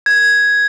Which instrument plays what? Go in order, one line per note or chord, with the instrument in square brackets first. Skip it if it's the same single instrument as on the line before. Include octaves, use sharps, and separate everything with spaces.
[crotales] G#6